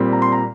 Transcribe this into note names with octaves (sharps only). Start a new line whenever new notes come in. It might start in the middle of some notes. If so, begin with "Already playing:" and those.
Already playing: A#2 G3 C4
A#5
C6
A#5